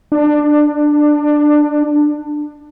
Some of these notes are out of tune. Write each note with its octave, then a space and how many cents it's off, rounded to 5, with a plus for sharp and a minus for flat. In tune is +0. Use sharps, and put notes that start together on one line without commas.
D4 +20